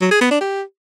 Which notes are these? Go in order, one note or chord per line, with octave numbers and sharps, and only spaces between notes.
F#3
G#4
B3
D4
G4